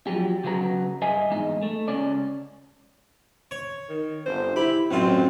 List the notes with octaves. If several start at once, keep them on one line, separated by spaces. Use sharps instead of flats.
F3 F#3 G4
C#3 F#3 F#4 B4 A#5
G2 D#5 E5 G#5
E2 G#2 D#4
A3
C#2 C#4 D5
C#5
D#3
G1 C5
E4 G4 B5
A1 F#2 F#3 C4 F4